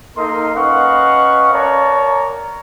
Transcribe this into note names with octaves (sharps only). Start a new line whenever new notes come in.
A#3 D#4 A4 A#4 D#5 C6
C#4 B4 D#5 F5 F#5 C#6
A#4 C#5 D5 A5 A#5